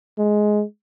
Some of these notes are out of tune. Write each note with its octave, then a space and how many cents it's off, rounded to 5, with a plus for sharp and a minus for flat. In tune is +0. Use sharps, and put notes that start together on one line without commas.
G#3 +10